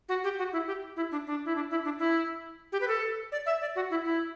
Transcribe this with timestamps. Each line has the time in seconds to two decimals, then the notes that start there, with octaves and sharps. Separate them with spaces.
0.09 F#4
0.24 G4
0.39 F#4
0.52 E4
0.67 G4
0.96 E4
1.11 D4
1.27 D4
1.45 E4
1.56 D4
1.71 E4
1.85 D4
1.99 E4
2.72 G4
2.81 B4
2.88 A4
3.32 D5
3.46 E5
3.61 D5
3.75 F#4
3.91 E4
4.05 E4